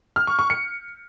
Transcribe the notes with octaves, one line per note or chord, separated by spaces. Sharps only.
F6
C#6
C#6
C#7